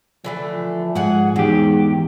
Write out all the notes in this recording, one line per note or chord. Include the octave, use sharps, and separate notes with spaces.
D3 E3 F3 A3
G#2 F#4 G#4 F#5
E2 G#2 F#3 G4